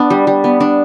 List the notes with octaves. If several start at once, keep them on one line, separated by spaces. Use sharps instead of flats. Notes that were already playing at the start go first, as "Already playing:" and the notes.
Already playing: B3 D4
G3
G3
B3
D4